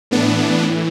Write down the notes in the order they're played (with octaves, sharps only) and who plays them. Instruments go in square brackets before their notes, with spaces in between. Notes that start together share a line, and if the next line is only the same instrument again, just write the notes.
[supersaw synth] A2 E3 B3 D4